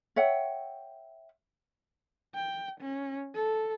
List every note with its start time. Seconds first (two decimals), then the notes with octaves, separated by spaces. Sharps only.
0.16 C#5 E5 F#5 G5
2.35 G5
2.80 C#4
3.35 A4